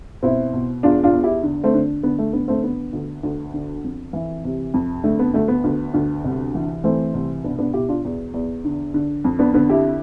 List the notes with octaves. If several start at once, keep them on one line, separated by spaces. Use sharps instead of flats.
B2 C4 E4
B2
E2 D4 F4
D4 F4
E2
E4 G4
D3
A3 C4
D3
D3 B3
A3
D3 B3
A3 C4
D3 B3
D2
D2
D3
F2
E3
C3
F2
D3 A3
B3
D2 A3
B3
D2
D2
C2
E3
E3 A3 C4
C2
B2 B3 D4
B3 D4
B2 E4 G4
D4 F4
E2
E2
D3
D3
F2
B3 D4
D3 B3
E4 G4